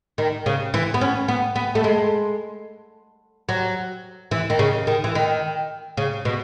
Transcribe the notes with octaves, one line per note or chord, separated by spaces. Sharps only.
D#3
C#3
E3
B3
C#4
B3
B3
A3
G#3
F#3
E3
D#3
C#3
D#3
E3
D#3
C#3
B2